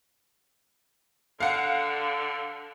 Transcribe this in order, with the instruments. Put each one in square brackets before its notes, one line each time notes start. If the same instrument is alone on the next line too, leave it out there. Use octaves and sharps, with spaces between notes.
[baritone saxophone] D3 [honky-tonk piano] F5 F#5